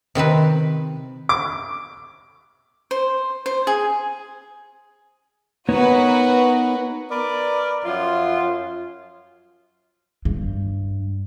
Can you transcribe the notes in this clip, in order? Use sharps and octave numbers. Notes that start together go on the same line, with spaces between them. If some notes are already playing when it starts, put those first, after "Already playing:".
C3 D#3 C4 B4
D6
C5
C5
G#4
B3 D#4 F#4 A#4 B4 C#5
A#4 B4 D5
F#2 F3 F4
G2